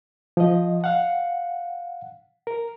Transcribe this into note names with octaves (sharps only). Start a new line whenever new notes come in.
F3 D#5
F5 F#5
A#4